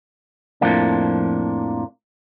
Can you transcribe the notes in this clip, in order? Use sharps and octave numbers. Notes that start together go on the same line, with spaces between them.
F2 A2 F3 A#3 D4